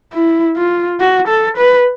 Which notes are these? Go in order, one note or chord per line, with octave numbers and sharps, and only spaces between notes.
E4
F4
F#4
A4
B4